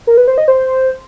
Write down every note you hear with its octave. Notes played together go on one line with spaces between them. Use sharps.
A#4
B4
C5
D#5
C5